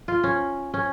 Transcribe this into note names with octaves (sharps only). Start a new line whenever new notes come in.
F4
C#4
C#4